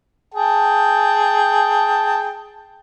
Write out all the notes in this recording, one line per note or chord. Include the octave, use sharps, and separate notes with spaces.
G#4 G5 A5